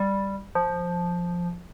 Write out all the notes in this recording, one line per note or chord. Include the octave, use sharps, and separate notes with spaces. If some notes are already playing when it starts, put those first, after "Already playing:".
Already playing: G3
F3